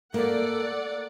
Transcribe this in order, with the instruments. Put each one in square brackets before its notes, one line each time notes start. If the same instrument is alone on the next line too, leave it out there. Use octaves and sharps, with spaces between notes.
[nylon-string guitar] A#3 [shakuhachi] A4 [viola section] D5 F#5